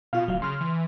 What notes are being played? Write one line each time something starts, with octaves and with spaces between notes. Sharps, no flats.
B2 F4 F5
D1 F#3 F5
C#3 C6 F6
E3